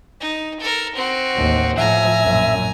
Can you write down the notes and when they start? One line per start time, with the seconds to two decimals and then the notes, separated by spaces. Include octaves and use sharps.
0.20 D#4
0.60 A4 A#4
0.95 C4 F#4
1.34 A1 D#2
1.78 A2 F3 E5 G#5 A#5
2.22 A#1 F#2